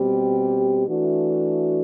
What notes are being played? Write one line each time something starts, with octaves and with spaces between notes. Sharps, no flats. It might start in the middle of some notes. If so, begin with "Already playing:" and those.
Already playing: B2 G3 C4 G4
E3 A3 D4 F#4